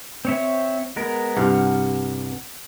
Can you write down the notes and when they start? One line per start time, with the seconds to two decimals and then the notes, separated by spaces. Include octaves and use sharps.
0.25 C4 C#5 E5
0.96 G#3 B3 A#4
1.37 C2 G2 F#5 F6